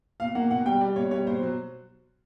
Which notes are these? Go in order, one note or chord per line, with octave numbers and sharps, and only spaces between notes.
B2 F5
A#3 F#5
B2 F#5
G3 G5
G3 D5
B2 C#5
G3 C#5
B2 C5
F#3